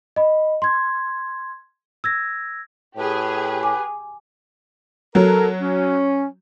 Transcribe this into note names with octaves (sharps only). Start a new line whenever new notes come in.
D#5 B5
C6 G#6
E6 G#6 A#6
A2 G4 G#4 B4
G#5 D6
F#3 A4 A#4
C#4